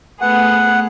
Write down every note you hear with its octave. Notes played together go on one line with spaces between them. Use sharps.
A3 B3 G#4 F#5